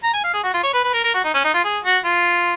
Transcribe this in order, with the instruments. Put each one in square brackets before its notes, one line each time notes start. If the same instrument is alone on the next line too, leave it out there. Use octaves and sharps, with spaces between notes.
[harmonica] A#5
G#5
F5
G#4
F#4
F4
C#5
B4
B4
A#4
A#4
F#4
D#4
C#4
D#4
F4
G#4
F#4
F4